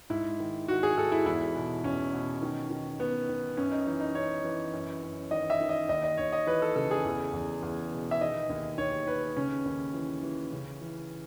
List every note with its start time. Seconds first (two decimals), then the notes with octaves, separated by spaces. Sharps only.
0.10 G#2 E4
0.40 D#3
0.68 D#3 F#4
0.83 G#4
0.97 G#2 A4
1.12 E4
1.26 E2 E4
1.56 B2
1.84 E2 C#4
2.13 B2
2.42 D#3
2.70 D#3
3.00 D#3 B3
3.29 D#3
3.57 F#2 C#4
3.72 D#4
3.87 E3 D#4
4.00 D#4
4.15 F#2 C#5
4.44 E3
4.74 F#2
5.03 F#2
5.31 D#3 D#5
5.50 E5
5.60 D#3
5.69 D#5
5.89 D#2 D#5
6.04 D#5
6.17 D#2 C#5
6.33 D#5
6.47 E3 B4
6.62 A4
6.76 C#3 A4
6.91 G#4
7.04 E2
7.33 E2
7.62 E2
7.91 B2
8.11 E5
8.21 D#3 D#5
8.50 D#2
8.78 D#2 C#5
9.07 D#3 B4
9.37 C#3 C#4
9.66 D#2
9.94 E3
10.23 E3
10.53 C#3
10.81 E3